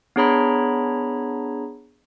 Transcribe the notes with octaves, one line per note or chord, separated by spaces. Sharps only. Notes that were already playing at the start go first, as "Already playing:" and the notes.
B3 D4 G#4 C#5 A#5 B5